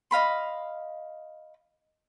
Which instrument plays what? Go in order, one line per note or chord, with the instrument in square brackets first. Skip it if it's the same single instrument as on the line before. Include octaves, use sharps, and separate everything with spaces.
[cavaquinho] D#5 F5 B5 C6